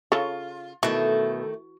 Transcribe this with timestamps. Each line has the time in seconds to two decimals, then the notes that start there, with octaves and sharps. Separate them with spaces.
0.12 C#3 F4 A4 C#5
0.83 B2 D#3 E3 A3 A4